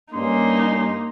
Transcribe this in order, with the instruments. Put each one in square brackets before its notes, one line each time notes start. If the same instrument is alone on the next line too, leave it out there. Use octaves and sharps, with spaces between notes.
[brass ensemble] G2 C#4 [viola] A#3 D#4 [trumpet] C6